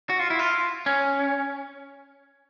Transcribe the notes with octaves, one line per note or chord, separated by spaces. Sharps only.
F#4
F4
E4
F4
C#4